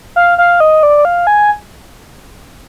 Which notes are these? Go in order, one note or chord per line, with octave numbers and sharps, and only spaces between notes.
F5
F5
D#5
D5
F5
G#5